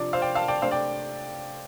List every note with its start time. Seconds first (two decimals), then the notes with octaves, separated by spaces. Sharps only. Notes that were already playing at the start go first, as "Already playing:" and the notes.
Already playing: C3 F3 D4 D5
0.13 C5 F5
0.22 D5 G5
0.35 F5 A5
0.48 D5 G5
0.62 C3 A3 D4 C5 F5
0.71 D5 G5